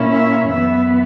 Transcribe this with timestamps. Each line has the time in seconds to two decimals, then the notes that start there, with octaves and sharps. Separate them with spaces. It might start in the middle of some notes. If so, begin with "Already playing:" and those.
Already playing: A#2 A#3 C#4 E4
0.13 E5
0.51 F#2 E3 B3 E5